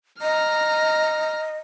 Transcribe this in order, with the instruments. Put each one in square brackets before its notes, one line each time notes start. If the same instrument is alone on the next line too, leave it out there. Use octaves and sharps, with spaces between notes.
[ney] D#5 [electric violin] A#5 F6